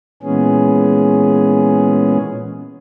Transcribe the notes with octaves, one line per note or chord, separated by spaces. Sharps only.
A#2 E3 G#3 B3 C#4 G#4